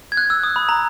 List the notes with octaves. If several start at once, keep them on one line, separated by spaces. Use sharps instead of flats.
G#6
F#6
E6
D#6
B5
A#5